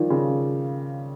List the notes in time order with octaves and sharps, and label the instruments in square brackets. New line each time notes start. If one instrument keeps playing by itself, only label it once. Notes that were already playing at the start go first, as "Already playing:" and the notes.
Already playing: [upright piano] D#3 F3 G3
C#3